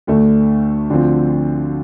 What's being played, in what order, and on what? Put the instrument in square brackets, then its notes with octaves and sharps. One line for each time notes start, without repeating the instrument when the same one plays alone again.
[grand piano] D2 D3 A3
D2 D3 F3 C4